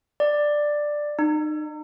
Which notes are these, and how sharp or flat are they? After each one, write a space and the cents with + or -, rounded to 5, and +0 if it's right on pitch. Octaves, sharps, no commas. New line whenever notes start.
D5 +10
D#4 -35